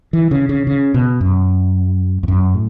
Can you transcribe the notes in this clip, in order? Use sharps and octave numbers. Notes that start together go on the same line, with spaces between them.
E3
C#3
C#3
C#3
B2
F#2
E2
F#2
A2